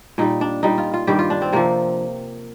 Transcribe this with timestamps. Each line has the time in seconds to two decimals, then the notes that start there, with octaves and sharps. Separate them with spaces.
0.18 A#2 G3 D#4
0.41 D4
0.63 A#2 G3 D#4
0.78 F4
0.94 F4
1.07 G2 D#3 G3 G4
1.19 F4
1.30 D4
1.42 C4
1.53 C3 F3 A#3